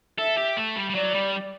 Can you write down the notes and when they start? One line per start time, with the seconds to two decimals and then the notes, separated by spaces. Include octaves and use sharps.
0.18 A4 E5
0.38 G4
0.57 A3
0.76 G3
0.90 G3
0.95 F#3 D5
1.15 G3